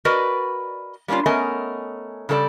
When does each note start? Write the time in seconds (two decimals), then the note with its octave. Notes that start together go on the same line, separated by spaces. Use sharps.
0.05 F#4 A#4 B4 D5 D#5
1.08 G3 A#3 C#4 D4 F4
1.26 A3 B3 C#4 A#4 D#5 G#5
2.29 C#3 G3 A4 B4 D5